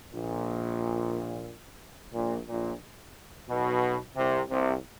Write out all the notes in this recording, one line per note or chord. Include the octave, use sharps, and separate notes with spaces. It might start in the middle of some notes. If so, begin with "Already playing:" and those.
A#1 A#2
A#1 A#2
A#1 A#2
B1 B2
C2 C3
C2 C3